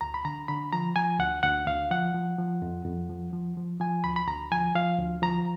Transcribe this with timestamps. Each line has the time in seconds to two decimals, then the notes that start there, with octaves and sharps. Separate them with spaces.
0.01 D2 A#5
0.14 B5
0.25 D3 A#5
0.48 D3 B5
0.72 F3 A#5
0.96 F3 G#5
1.19 D2 F#5
1.43 D2 F#5
1.67 D2 F5
1.91 F3 F#5
2.14 F3
2.39 F3
2.62 F2
2.85 F2
3.09 F3
3.33 F3
3.57 F3
3.80 F3 G#5
4.04 D2 B5
4.16 B5
4.28 D2 A#5
4.52 F3 G#5
4.75 F3 F5
4.99 D2
5.22 F3 A#5